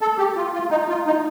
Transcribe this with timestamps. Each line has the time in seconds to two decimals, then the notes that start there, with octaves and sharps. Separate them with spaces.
0.01 A4
0.18 G4
0.36 F4
0.53 F4
0.71 D#4
0.89 F4
1.06 D#4